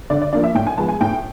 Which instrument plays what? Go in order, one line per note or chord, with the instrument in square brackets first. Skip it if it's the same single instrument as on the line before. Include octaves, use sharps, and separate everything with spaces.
[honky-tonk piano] D3 D5
D5
F3 A#3 D4 D5
E5
A2 G5
G#5
F3 G#3 B3 A5
G#5
A2 G5